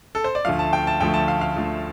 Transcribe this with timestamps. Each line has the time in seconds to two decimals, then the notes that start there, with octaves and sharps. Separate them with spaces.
0.15 A4
0.24 C5
0.35 D5
0.45 D2 D3 F3 A3 F5
0.59 A5
0.73 G5
0.87 A5
1.00 D2 D3 F3 A3 G5
1.14 A5
1.28 F5
1.41 F5
1.56 D2 D3 F3 A3